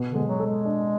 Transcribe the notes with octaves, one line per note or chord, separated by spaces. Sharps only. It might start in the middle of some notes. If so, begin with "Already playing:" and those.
Already playing: B2
D3
G#3
F#3
A4
G#3
D4